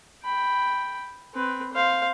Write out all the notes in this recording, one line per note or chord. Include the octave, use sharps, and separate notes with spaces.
G5 B5
C4 B4
C5 F5